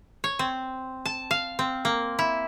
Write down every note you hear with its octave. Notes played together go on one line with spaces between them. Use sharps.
C#5
C4
A5
F5
C4
A#3
E4